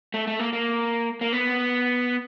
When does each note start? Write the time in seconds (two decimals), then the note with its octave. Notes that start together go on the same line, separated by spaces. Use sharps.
0.14 A3
0.27 A3
0.39 A#3
0.53 A#3
1.21 A#3
1.33 B3